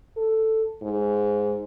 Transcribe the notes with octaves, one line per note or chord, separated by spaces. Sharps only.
A4
G#2